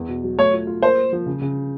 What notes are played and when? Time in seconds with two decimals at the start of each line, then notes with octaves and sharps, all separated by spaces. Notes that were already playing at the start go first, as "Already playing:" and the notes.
Already playing: E2
0.09 B2
0.24 F#3
0.38 A3 C#5
0.53 F4
0.67 F4
0.82 A#3 C5
0.98 A#3
1.13 F3
1.26 C#3
1.42 C#3